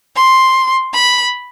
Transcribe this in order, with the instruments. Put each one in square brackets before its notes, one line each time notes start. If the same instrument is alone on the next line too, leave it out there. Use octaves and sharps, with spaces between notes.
[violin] C6
B5